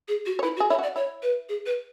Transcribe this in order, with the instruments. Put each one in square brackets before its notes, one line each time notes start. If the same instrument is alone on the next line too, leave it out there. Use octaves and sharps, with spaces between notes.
[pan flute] G#4
F#4
[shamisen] C#5
[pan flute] E4 [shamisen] B4
[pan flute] F#4
[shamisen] G#4
[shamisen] E4 [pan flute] C#5
[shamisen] F#4 [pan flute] D5
[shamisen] E4 [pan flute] C#5
[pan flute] B4
G#4
B4